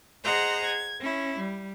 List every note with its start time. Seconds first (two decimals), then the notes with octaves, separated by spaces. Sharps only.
0.24 G#4 C5 D#5 F#5 A#5 C6
0.65 G#6
1.00 C#4 E4
1.39 G3